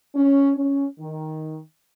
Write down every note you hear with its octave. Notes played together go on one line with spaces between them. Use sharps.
C#4
C#4
D#3